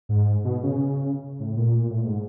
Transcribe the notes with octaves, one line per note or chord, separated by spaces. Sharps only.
G#2
B2
C#3
A2
A#2
A2
G#2